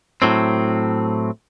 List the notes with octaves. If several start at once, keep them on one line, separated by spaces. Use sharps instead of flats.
A2 F#3 C4